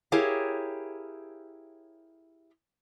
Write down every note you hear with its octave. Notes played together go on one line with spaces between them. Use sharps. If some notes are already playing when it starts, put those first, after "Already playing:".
E4 G4 G#4 A#4 C#5 F5